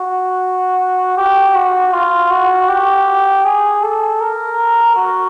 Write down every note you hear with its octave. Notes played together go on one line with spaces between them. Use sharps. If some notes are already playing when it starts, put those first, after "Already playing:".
Already playing: F#4
G4
F#4
F4
F#4
G4
G#4
A4
A#4
F#4